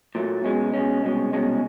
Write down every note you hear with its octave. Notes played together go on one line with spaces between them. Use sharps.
A#2 F#3 A3
B2 G#3 C#4
B2 G#3 C#4
C2 B2 G#3 C#4
C2 B2 G#3 C#4